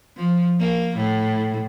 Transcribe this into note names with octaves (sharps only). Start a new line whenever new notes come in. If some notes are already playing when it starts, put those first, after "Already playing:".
F3
A#3
A2